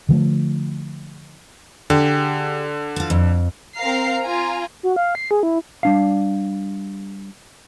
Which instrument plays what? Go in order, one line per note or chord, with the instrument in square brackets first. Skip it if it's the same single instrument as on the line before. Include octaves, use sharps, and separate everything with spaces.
[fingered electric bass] D3 F3 A3
[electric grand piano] D3 [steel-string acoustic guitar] G4 G#4
[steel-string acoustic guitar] F4 A5
F2
[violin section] C4 A#4 F5 A#5 F6 C7
F4 G#5 A#5
[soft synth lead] F#4
F5
C7
G#4
E4
[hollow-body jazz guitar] G3 D4 F5